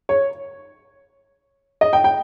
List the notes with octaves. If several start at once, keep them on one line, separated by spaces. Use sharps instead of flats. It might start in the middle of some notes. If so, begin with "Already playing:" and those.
C#5
D#5
G5
G5